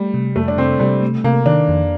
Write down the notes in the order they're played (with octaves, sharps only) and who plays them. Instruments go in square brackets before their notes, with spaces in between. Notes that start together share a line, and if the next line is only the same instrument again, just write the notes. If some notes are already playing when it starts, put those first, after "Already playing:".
Already playing: [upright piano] G3 [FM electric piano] A3
[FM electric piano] C3
[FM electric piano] F2 [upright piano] A3
[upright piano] D4
[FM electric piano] C3 [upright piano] C4
[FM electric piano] C3 [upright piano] G3
[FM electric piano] A3
[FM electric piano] C3 [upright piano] A#3
[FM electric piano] D#3 [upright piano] D4
[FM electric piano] F2